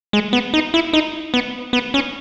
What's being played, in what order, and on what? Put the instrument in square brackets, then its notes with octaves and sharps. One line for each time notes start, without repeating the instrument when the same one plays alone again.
[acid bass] G#3
B3
D#4
E4
D#4
B3
B3
C#4